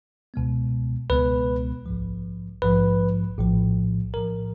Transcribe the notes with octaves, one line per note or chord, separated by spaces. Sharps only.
C#2 B2 G#3 B3
C#2 B2 G#3 B3 B4
A#1 G#2 F3
A#1 G#2 F3 B4
A#1 A2 F3
A#1 A2 F3 A#4